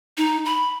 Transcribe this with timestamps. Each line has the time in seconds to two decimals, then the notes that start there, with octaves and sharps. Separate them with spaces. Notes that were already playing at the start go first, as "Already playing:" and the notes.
0.18 D#4
0.45 B5